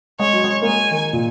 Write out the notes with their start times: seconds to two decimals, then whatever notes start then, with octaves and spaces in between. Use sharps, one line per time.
0.19 G#3 C#5
0.33 F#3
0.44 G#3
0.62 A#3
0.66 G#3 G#5
0.91 D#3
1.13 A#2